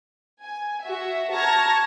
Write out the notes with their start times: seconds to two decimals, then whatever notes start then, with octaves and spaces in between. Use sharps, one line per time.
0.41 G#5
0.83 F#4 E5
1.33 A5 A#5 C#6 F6 G#6 A#6